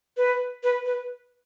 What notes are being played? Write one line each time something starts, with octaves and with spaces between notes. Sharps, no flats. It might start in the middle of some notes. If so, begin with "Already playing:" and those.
B4
B4
B4